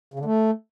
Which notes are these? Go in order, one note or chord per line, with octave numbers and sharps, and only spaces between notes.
C#3
D3
A3